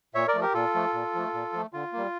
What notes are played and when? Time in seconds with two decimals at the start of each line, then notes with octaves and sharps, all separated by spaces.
0.14 A#2 C#5 E5
0.27 A#4 D5
0.34 F3 A3
0.41 G4 A#4
0.54 A#2 F4 A4
0.75 F3 A3
0.93 A#2
1.15 F3 A3
1.34 A#2
1.53 F3 A3
1.73 D3 F4
1.93 G3 A#3